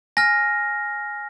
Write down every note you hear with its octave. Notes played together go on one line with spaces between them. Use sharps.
G#5 F6 A#6